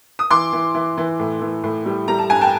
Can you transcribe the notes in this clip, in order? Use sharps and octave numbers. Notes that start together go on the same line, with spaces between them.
D#6
E3 C6 D6
E3
E3
E3
A2
E3
A2
G3
G3 A#5
A5
G2 G#5
G5 A5